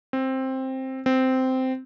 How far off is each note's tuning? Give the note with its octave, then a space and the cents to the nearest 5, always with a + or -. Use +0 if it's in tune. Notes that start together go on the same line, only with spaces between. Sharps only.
C4 +10
C4 -10